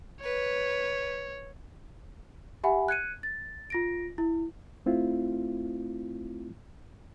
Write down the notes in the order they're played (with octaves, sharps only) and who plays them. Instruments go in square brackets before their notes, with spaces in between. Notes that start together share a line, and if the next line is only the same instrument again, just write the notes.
[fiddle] B4 [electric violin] C#5
[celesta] G4 E5 F#5 G#5 B5
F#6 G#6 C#7 D#7
A6
F4 A#6 D7
E4
[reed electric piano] A3 C4 E4 F4